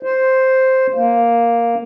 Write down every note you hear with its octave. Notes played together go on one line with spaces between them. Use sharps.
C5
A#3